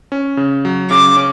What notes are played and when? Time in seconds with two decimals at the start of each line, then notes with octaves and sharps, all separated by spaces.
0.12 C#4
0.37 C#3
0.65 F#3
0.90 C#3 D6
1.16 C#4